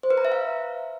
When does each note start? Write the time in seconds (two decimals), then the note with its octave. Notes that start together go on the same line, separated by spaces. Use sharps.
0.03 C5
0.10 B4
0.18 A#5
0.25 E5
0.32 F5